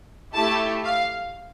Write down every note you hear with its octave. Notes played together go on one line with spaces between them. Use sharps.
A3 E4 G4 A5
F5